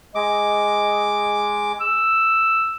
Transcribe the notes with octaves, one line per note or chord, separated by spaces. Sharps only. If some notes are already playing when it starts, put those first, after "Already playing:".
G#3 D#5 D6
E6